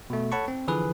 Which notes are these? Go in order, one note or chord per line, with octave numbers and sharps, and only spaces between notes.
B2 A3
A4 C#5 F#5 A5 B5 C#6
C4
D3 E3 F3 G#4 B4